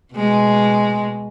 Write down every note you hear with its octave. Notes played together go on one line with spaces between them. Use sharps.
B2 G#3